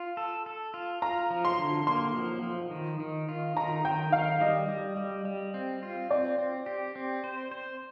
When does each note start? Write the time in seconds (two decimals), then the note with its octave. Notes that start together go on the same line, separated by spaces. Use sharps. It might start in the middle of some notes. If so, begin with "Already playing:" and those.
Already playing: F4
0.17 A4
0.46 A4
0.74 F4
1.02 F4 A#5
1.30 F3
1.45 C6
1.58 D3
1.87 A#3 C6
2.14 F3
2.43 F3
2.71 D#3
3.00 D#3
3.29 F4
3.56 D#3 A#5
3.85 D#3 G5
4.12 D#3 F5
4.40 G3 D#5
4.69 G3
4.97 G3
5.25 G3
5.54 C4
5.83 F4
6.10 C4 D5
6.38 C4
6.66 G4
6.96 C4
7.24 C5
7.52 C5